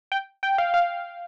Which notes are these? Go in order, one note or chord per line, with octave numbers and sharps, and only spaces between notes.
G5
G5
F5
F5